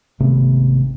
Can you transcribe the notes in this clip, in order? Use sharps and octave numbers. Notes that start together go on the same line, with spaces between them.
G#1 C3 A3 B3